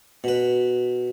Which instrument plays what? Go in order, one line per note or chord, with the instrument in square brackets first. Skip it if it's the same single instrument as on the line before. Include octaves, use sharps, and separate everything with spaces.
[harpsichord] B2 B4